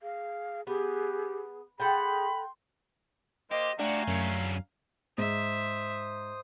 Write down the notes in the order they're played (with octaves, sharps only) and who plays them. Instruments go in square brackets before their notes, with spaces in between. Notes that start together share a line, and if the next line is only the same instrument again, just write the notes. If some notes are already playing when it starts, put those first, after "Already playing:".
[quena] G#4 [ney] F5
[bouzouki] B3 [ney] G4 [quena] G#4
[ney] G#4 [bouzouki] A4 F#5 G5 [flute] B5 [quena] C6
[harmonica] A#3 C5 [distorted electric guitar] G4 [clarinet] D#5
[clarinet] A3 [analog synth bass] D4 [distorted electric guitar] F#4 G4 [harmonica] F5 G#5 A#5
[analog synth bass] F#2 [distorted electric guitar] D3 C#4
[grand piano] G#2 [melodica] C5 D#6 [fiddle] E5